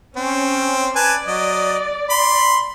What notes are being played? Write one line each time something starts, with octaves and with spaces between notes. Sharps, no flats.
C4 C#4
B4 D5 G#5 A5
F#3 D#5
B5 C6